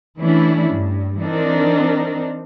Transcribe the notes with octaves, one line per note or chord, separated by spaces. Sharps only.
E3 A3 C#4 D4 E4
G2
E3 C4 D4 D#4 A#4